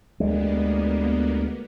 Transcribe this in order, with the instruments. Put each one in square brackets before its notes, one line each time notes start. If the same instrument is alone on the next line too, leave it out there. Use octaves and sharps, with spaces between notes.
[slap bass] D2 G3 G#3 [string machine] A#3 B3